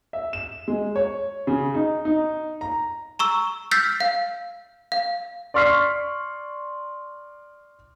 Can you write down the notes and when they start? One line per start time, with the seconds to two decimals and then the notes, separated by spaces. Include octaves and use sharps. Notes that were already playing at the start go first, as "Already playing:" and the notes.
0.13 E5
0.33 E7
0.68 G#3
0.96 C#5
1.47 C#3
1.74 D#4
2.05 D#4
2.61 A#5
3.19 A#5 C#6 E6
3.71 E6 F6 G6 A6 B6 C7
4.00 F5
4.92 F5
5.54 D5 C6 C#6 F6 B6 C7